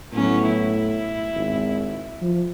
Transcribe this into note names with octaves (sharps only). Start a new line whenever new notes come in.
A2 F#3 B3 C#4
E4
G#1
F3